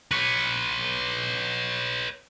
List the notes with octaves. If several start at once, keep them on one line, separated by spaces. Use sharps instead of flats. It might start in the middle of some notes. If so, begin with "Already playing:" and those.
B4 C#5